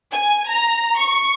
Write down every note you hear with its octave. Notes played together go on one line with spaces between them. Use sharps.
G#5
A#5
C#6